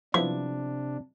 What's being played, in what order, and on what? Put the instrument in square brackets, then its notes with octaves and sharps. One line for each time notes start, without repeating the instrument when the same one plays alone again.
[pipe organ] C3 D4 [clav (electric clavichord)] F3 B3 E4 [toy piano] D6